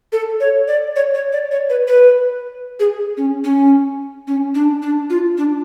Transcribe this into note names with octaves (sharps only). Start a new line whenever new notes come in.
A4
C#5
D5
C#5
C#5
D5
C#5
B4
B4
G#4
C#4
C#4
C#4
D4
D4
F4
D4